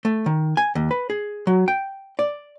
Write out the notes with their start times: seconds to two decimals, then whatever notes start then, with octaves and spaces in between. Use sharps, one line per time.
0.05 A3
0.26 D#3
0.57 G#5
0.75 D#2
0.91 B4
1.10 G#4
1.47 F#3
1.68 G5
2.19 D5